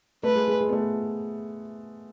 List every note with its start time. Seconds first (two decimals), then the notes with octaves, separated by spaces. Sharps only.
0.23 A3 B4
0.35 G#3
0.48 G#3
0.61 G#3
0.69 B3
0.73 A3